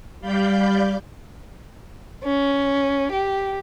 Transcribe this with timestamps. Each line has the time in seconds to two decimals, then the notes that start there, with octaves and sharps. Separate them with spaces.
0.20 G3 D5 F5 B5 G6
2.24 C#4
3.12 G4